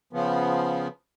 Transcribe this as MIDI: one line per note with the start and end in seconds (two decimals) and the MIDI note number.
0.13 0.88 49
0.13 0.88 53
0.13 0.88 59